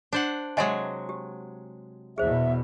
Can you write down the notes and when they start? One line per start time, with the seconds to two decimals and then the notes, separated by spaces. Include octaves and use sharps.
0.13 D4 C5 F#5
0.57 C3 F#3 G#3 D#5 E5 G#5
1.09 G4
2.18 E2 B2 G#4 C5 E5